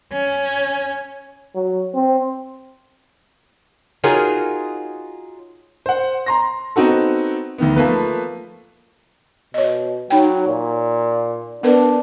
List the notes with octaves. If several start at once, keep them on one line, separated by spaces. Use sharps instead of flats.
C#4
F#3
C4
D#4 F4 F#4 G#4 A#4 C#5
C5 F#5
A#5 C6 A#6
B3 C4 D#4 F#4 A4
D2 D#3 B3
F3 A3 A#3 B4
B2 C#5 D#5
F#3 D#4 G5
A#2
B3 D4 A#4 B4